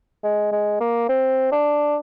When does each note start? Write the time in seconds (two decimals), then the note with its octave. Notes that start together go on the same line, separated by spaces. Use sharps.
0.23 G#3
0.52 G#3
0.80 A#3
1.09 C4
1.52 D4